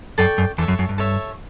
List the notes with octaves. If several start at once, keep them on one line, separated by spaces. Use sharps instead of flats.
F#2 A4 D5 G5 C#6
F#2
E2 A4 C#5 E5
F#2
F#2
G2
A4 C#5 E5